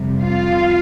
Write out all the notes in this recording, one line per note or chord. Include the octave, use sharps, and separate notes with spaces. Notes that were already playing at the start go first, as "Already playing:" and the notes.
Already playing: F2 C3 G3
F4 F5